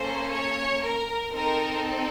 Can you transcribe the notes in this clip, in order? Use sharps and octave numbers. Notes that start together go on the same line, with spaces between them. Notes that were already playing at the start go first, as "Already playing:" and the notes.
Already playing: A#3 C#4 A4 C5
C#5
A#4
C4 D#4 A4 A#4